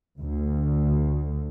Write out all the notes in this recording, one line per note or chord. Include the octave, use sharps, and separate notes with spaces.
D2